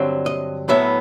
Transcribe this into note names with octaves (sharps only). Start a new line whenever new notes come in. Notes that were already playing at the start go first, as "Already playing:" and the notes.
Already playing: G2 D3 F#3 C4
D#5
A2 F#3 B3 E5